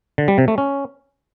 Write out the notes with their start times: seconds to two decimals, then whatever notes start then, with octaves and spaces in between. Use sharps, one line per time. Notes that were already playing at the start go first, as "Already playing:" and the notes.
0.18 D3
0.28 G3
0.38 C3
0.48 A3
0.58 C#4